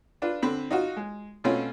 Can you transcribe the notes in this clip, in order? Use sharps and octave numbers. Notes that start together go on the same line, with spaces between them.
D4 F4 B4
D3 C4 B5
D#4 F4 F#4
G#3
B2 A3 C4 C#4 F4